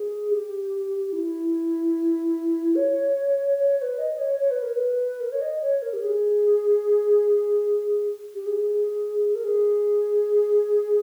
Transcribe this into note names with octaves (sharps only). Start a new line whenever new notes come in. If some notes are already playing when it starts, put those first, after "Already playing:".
Already playing: G#4
G4
E4
C#5
C#5
C#5
B4
D#5
C#5
C#5
B4
A#4
B4
A#4
C#5
D#5
C#5
A#4
G4
G#4
G4
G#4
G#4
A#4
G#4